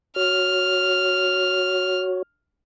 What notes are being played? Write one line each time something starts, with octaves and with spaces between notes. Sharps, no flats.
F#4 C#5 F6